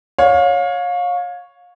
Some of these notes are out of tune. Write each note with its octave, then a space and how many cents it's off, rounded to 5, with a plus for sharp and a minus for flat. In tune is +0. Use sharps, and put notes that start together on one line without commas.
C#5 +0 F5 +30